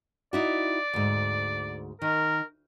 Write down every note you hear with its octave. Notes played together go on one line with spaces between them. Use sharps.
D#4 E4 F#4 D5
D2 G#2
D#3 A#4